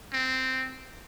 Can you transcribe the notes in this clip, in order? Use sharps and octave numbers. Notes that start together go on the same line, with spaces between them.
C4